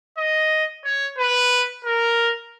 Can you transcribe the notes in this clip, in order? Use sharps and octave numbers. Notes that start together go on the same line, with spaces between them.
D#5
C#5
B4
A#4